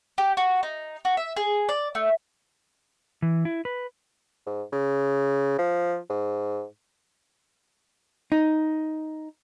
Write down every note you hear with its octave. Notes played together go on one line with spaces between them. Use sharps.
G4
F#4
D#4
F#4
E5
G#4
D5
A3
E3
E4
B4
G#2
C#3
F3
G#2
D#4